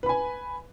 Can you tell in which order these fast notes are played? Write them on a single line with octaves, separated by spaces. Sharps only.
B4 B5 G#5